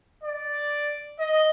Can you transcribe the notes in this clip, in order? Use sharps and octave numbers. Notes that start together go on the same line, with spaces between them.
D5
D#5